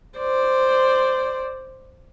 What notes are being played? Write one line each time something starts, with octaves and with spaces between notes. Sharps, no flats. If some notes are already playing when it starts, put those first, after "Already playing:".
C5 D5